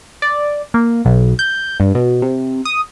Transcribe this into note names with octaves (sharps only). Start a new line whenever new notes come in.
D5
A#3
B1
G6
G2
B2
C3
D#6